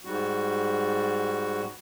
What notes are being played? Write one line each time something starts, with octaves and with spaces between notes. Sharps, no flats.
G#2 G3 F#4